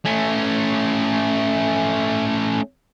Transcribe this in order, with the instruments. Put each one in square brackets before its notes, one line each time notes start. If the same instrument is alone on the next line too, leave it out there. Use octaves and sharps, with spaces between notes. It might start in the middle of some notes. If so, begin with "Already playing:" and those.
[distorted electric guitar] A3 C#4